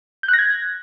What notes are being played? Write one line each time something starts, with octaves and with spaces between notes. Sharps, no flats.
G6
F#6
A#6
G#6